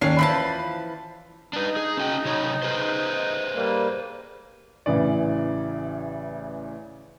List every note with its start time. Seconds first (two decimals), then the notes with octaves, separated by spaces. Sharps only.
0.01 D#2 C#4 D4 F5 C7
0.19 E3 F3 A5 B5
1.53 D4 D#4 B4
1.76 G#4
1.97 C#4 F#4 G5
2.25 C3 F#3 C#5
2.63 G#4 B4 C5
3.55 G3 A#3
4.86 A1 C#3 E3 D5